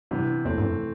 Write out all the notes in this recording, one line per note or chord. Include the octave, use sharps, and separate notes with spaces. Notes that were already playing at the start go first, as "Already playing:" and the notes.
G2 C3 E3 B3
E2 E3 A3 C4
G2
F#2